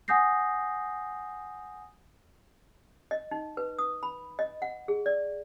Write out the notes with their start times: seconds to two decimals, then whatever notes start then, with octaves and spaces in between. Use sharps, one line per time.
0.08 F#5 G#5 D#6 G6 A#6 C7
3.11 D#5
3.31 D#4
3.57 B4
3.79 D#6
4.03 B5
4.39 D#5
4.62 F#5
4.88 G#4
5.06 D5